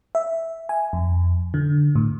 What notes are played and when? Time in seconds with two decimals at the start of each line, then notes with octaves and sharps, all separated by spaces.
0.15 E5
0.69 G#5
0.93 F2
1.54 D3
1.96 A2